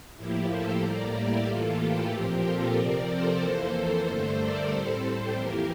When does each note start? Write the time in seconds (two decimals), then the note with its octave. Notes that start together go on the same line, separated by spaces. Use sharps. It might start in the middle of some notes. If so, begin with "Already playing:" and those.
0.17 A2 F3 A#3 E4 G4
0.49 A4 C5
0.81 A2 G3 A#3 A#4 D5
1.13 E4 G4
1.46 A2 E3 A#3 F4 A4
1.79 E4 G4
2.11 A#2 F3 C4 G4 A#4
2.43 F4 A4
2.76 C3 F3 C4 A#4 D5
3.08 A4 C5
3.40 F2 E3 A#3
4.05 G2 D3 A3 A4 C5
4.38 A#4 D5
4.69 A2 G3 C4 A4 C5
5.02 A4 C5
5.34 F2 E3 A#3 G4 A#4